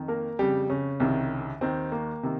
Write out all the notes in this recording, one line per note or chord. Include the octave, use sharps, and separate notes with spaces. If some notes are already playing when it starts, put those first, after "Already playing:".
Already playing: F2 D#3
A#3 A#4
F2 C#3 G3 G4
C#3 C#4
C2 C3 D#3
D#2 D#3 C4
A#3
C3 D#3